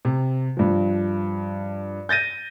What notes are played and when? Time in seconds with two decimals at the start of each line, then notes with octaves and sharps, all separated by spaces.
0.05 C3
0.57 G2 F3
2.09 G6 A6 A#6 D#7